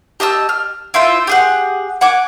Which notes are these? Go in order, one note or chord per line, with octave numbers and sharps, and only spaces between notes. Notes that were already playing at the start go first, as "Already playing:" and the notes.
G4 D#5 A5 E6
F6
E4 F4 C5 E5
G4 G#4 F#5
F#5 G#5 D6